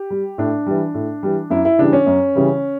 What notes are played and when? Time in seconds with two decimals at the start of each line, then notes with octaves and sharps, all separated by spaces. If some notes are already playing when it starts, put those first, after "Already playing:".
Already playing: G4
0.10 G3
0.38 A2 D4
0.66 E3 G3
0.94 A2
1.23 E3 G3
1.50 F#2 E4
1.65 E4
1.78 C#3 E3 G3 D4
1.93 C#4
2.06 F#2
2.35 C#3 E3 G3